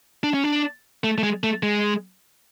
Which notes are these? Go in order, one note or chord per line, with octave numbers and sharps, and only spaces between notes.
D4
C#4
D4
A3
A3
G#3
A3
G#3